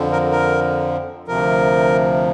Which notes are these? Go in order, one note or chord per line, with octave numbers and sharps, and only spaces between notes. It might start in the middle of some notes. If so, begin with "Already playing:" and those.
Already playing: F2 D3 F3
A#4
A#4
D2 C3 F3 A#4